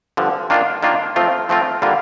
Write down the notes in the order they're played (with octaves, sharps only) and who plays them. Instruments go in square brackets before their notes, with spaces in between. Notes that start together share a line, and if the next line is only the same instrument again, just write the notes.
[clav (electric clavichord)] G2 D3 F3
D#3 A#3 D4 F4
D#3 A#3 D4 F4
F3 A3 C4 F4
F3 A3 C4 F4
D3 G3 A#3 F4